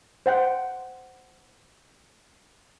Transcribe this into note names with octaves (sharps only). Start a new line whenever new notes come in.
C5 F#5 G5